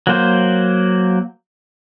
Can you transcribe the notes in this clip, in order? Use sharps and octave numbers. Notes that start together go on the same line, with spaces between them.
F#3 A#3 C5